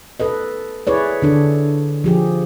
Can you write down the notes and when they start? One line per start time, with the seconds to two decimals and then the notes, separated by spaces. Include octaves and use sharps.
0.20 A4 B4 D#5
0.87 E4 G#4 B4 C#5 D5
1.22 D3 D4 A4
2.04 F3 G4 G#4